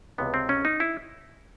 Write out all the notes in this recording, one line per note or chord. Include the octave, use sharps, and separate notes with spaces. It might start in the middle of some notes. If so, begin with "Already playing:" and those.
C#2 C3 E3 B3
C4
C#4
D#4
E4